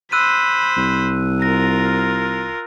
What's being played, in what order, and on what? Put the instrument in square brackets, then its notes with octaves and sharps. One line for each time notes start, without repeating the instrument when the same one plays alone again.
[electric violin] C5 B5 [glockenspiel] E6 F#6 D#7
[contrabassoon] C2
[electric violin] F4 A#4 [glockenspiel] A#6